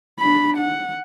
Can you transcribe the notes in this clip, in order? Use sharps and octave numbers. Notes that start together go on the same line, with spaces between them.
D4 B5
F#5